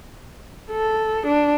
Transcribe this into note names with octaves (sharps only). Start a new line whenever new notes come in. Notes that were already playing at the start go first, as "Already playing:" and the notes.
A4
D4